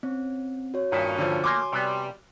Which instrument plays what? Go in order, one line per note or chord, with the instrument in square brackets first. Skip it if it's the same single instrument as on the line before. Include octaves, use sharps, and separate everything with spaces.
[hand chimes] C4 [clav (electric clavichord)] C#4
[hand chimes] F#4 C#5
[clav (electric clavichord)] G2 D#3 E5 [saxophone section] A#2 C#4
[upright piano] D3 F3
[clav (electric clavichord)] A3 A#3 [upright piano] G#5 C6 D6
[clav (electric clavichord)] C3 B3 [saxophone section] G3